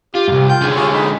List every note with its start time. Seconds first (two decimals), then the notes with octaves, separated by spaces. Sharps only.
0.15 F4 G4
0.28 C2 G2
0.49 F4 G5 G6
0.62 D3 G#3 D#4
0.75 F4 G4 G#4 C#5
0.93 D#4 G#4 B5